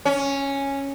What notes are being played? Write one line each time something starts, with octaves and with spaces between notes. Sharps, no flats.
C#4